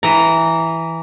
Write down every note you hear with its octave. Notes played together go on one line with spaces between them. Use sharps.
E3 A#5